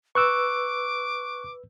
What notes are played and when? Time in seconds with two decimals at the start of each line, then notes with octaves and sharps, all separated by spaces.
0.15 B4 C#6 D6 E6 F#6